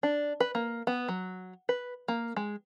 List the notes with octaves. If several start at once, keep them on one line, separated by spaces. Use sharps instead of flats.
D4
B4
A#3
B3
F#3
B4
A#3
G#3